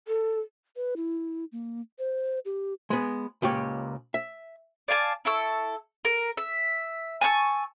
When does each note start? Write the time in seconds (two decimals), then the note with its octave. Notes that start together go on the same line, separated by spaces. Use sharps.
0.08 A4
0.76 B4
0.97 E4
1.52 A#3
1.99 C5
2.46 G4
2.90 G#3 B3
3.42 C#2 A#2 G4 C#5
4.14 E5
4.88 D5 F5 G#5 A5
5.25 E4 A4 C#6 E6
6.05 A#4
6.37 E5
7.21 G#5 A5 C#6 E6